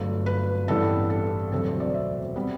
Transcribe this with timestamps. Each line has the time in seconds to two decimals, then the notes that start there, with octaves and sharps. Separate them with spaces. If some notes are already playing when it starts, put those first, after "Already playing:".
Already playing: G1 G2 F#3 A3
0.26 B4
0.68 A1 G2 E3 G3 B3 A4
1.10 A4
1.52 E1 D2 C3 F#3 C4 A4
1.66 C5
1.80 D5
1.94 E5
2.36 C3 G3 B3